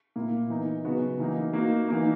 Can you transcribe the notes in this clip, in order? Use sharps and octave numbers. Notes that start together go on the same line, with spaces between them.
A#2 A#3 E4
E3 B3 D#4
C#3 F#3 B3 F#4
E3 A#3 D#4
A#3 D#4 F#4
E3 A#3 D#4